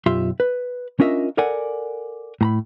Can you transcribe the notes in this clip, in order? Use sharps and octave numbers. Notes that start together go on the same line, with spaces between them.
B1 F#2 F4 G4 E5 C6
B4
C#4 D4 F4 A#4 D#5 E5
A4 A#4 D5 F#5 G#5
A2 A#5 B5